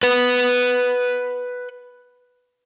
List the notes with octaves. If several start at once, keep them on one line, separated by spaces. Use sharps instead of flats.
B4 F#5